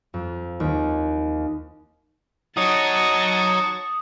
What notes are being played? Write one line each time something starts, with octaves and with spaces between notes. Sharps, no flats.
F2
D#2
D#4 F#4 C#5 A5 C#6 D#6